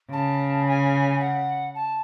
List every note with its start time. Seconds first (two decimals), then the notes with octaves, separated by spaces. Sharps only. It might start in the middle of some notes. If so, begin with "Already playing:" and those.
0.11 C#3 A5
0.66 G#5
1.20 F#5
1.75 A5